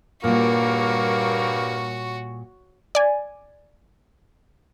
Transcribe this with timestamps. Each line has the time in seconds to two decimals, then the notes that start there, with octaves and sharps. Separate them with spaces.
0.24 G2 A#2 G3 A#3 F#4 A#4 C#5
2.95 D5 G#5